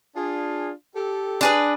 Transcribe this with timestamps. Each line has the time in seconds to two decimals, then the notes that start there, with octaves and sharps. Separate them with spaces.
0.16 D4 F4 G#4
0.95 G4 A4
1.41 D4 G#4 B4